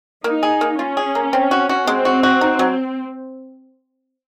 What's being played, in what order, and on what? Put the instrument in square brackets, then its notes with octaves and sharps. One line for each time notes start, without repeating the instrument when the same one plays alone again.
[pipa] A#3 [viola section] D#4
[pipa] G#4
A#3
[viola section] C#4 [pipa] F4
[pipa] G#4
A#3
C4
F#4
F#4
[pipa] G#3 [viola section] C4
[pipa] F#4
F#4
D#4
F#3